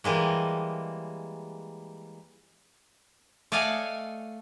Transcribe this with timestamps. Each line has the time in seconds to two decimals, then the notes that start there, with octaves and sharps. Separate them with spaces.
0.04 E3 G3 G#3 A#3
3.52 A3 D5 D#5 F5 F#5 G#5